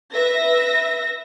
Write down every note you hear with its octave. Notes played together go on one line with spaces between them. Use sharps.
B4 E5 A#6